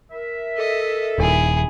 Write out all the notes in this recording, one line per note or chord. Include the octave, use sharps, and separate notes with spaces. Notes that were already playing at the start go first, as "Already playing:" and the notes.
A#4 E5
A4 D#5
D#1 E4 G#4